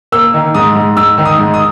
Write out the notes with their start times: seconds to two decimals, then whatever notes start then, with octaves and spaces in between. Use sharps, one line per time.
0.12 A#3 E6
0.34 D#3
0.55 G#2 D#6
0.75 G#2
0.97 G#2 E6
1.18 D#3
1.25 D#6
1.39 G#2
1.54 D#6